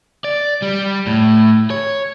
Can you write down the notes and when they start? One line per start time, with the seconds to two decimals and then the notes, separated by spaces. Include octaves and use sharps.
0.24 D5
0.62 G3
1.07 A2
1.70 C#5